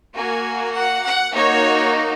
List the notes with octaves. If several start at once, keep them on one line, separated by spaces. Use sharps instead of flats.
A#3 F#4 G#5
F#5
F#5
A#3 D#4 F#4 C#5